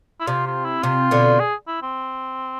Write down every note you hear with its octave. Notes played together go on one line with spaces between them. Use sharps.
E4
C3 F4
F4
E4
C3 F4
B2 D3
G#4
E4
C4